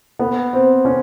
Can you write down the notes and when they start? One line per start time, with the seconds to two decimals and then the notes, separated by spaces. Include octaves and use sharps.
0.19 B3
0.53 C4
0.85 C#4